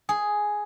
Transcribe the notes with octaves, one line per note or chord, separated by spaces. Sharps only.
G#4